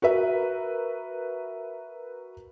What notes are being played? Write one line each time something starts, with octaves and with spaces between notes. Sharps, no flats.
F#4 A#4 B4 E5